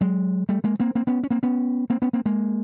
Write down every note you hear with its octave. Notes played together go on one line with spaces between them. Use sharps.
F#3 G#3
G3 A3
G#3 A#3
A#3 C4
A#3 C4
B3 C#4
C#4
A#3 C4
B3 C#4
A#3 C4
B3 C#4
A#3 C4
G#3 A#3